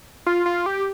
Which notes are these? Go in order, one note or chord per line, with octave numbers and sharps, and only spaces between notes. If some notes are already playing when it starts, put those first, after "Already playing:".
F4
F4
G4